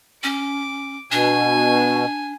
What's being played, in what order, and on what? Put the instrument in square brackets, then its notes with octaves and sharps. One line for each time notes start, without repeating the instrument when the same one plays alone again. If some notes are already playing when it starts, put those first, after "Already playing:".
[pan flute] C#4 [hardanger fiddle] D6
[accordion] B2 [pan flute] D4 [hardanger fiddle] G#5